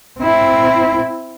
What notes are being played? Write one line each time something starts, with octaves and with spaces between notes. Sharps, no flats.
C4 E4